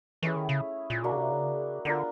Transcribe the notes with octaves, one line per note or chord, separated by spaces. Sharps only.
E3 A3 C#4 E4 G#4
D#3
C#3
A#2
B2 A#3 D4 F#4
C#3
C3
C#3
D3 B3 D4 F4 A#4